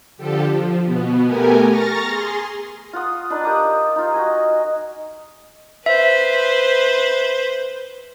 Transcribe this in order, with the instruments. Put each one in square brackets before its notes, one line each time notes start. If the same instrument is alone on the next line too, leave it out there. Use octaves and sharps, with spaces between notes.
[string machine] D3 F3 G4 A4
F3
B2 B3
A3 B3 G4 A#4 G#5
A#5 C#6 F6 A6 A#6
G#4 C6
[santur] F4 F#5 D#6
D4 D#4 B4
G4 A#4 D6 D#6
D#4 F4
F#4 D#5 G#5
[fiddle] B4 C5 [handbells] E5